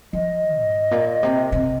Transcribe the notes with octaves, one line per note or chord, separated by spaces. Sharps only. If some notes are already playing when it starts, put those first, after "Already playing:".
F3 D#5
G#2
A#2
C3
C3